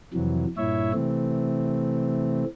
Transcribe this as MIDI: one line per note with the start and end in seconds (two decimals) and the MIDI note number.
0.14 0.46 41
0.14 0.46 48
0.14 0.46 52
0.14 0.46 54
0.57 0.92 43
0.57 0.92 46
0.57 0.92 64
0.57 0.92 73
0.57 0.92 76
0.94 2.44 48
0.94 2.44 52
0.94 2.44 57
0.94 2.44 60